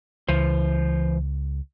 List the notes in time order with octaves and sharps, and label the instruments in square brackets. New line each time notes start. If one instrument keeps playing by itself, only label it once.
[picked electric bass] C#2 [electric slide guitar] E3 C5